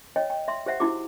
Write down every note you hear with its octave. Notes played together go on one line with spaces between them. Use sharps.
C#5 D#5 G5
G5
E5 C6
G4 C5 E5 F#5
D#4 E4 F#4 G4 D6